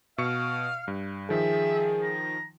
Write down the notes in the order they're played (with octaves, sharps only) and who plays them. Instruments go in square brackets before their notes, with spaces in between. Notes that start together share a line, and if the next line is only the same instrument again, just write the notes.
[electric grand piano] B2 C#6 C#7 [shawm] F5
[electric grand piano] G2
[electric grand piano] D#3 F3 [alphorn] G#4 [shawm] E5
[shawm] A#5